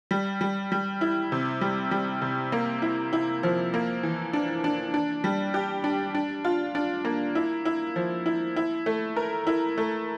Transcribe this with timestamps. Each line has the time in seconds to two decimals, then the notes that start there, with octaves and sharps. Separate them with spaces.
0.11 G3
0.41 G3
0.72 G3
1.01 E4
1.32 C3
1.61 G3
1.91 G3
2.22 C3
2.52 A#3
2.82 E4
3.13 E4
3.43 F3
3.74 A#3
4.03 E3
4.33 D4
4.64 D4
4.94 D4
5.24 G3
5.54 G4
5.84 D4
6.15 D4
6.45 F4
6.75 D4
7.05 A#3
7.35 E4
7.65 E4
7.96 F3
8.26 E4
8.56 E4
8.86 A3
9.16 A#4
9.47 E4
9.78 A3